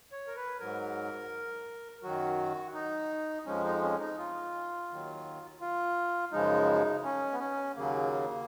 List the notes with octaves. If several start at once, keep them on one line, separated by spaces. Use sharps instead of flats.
C#5
A#4
B4
G#2 F#3 A#4
F#2 D#3 F#3 F#4
D#4
F2 F3 G#3 C#4
D#4
C#4
D#4
F4
D#2 D#3 F#3
F4
F#2 C#3 F3 G#3 D#4
C#4
B3
C#4
D#2 C#3 F#3 A#3